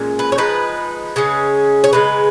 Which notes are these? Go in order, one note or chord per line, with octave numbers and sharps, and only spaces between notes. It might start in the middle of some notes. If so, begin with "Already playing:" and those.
Already playing: A#2 G#3 C#4
B4
C#5
F3 G#3 D#4 B4
C#3 G#3 C#4
C#5
C#3 G#3 D#4 B4